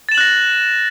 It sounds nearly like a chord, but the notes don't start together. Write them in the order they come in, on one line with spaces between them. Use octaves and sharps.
A6 E7 F#7 F#6 A#6